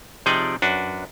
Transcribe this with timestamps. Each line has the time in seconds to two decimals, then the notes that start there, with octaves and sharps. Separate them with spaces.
0.26 C3 F3 D#4 G#4 D5 G5
0.62 F#2 D4 F#4 B4